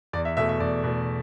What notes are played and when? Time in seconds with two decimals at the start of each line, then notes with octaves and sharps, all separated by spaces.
0.13 E2 D5
0.25 E5
0.37 B2 A3 E5
0.49 E5
0.60 E2 D5
0.84 B2 A3